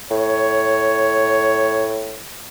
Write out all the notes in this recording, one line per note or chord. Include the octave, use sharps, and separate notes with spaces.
A2 C#5